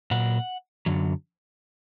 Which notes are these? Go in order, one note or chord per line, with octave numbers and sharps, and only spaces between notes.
A#2 F#3 F#5
F#2 D3 F#3